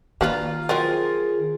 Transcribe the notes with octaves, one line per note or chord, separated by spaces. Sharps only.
D#3 A#3 D4 F4 B4 A#5
F3 F#3 C4 F4 G#4 A#4